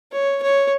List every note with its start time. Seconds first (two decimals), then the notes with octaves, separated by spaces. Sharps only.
0.12 C#5
0.42 C#5